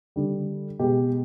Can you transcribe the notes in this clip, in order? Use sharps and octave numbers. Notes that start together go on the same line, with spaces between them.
D3 G3
B2 G#3 G4